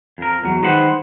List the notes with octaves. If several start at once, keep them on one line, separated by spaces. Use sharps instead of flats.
F2 A#4
E2 F#3
D#3 G#3 B4 C5 F#5